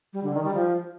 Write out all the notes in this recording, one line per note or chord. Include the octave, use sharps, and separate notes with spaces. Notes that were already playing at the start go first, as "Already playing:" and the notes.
G3
D3
D#3
G3
F3